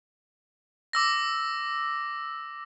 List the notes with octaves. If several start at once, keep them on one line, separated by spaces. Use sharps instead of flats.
D6 E6 A#6